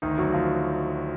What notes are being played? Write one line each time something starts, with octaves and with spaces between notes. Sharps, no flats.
D2 D#3 D#4
D2 F#3 F#4
F#4
D2 F3 F4